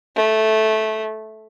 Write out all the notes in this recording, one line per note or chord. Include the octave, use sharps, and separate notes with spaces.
A3